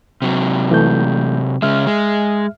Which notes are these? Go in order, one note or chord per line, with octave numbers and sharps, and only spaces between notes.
C3 F#3
E3 A3 G6
C#3 G#3 E5 F6
G#3